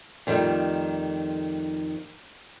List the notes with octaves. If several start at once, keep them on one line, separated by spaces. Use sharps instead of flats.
F2 D#3 G3 A3 D#4